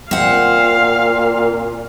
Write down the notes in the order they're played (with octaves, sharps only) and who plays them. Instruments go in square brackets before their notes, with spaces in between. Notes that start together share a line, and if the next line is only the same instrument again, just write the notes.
[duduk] A#2 [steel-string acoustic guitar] C4 F#5 [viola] F5